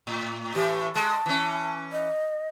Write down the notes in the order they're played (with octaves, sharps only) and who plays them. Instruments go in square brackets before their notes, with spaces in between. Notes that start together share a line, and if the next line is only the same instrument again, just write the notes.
[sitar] A2
[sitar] A2 E3 [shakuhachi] G4
[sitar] G#3 [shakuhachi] A5
[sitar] E3 C#4
[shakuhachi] D#5